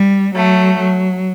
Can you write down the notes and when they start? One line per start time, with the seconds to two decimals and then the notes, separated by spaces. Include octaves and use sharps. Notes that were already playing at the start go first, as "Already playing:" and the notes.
Already playing: G3
0.34 F#3 A3
0.77 F#3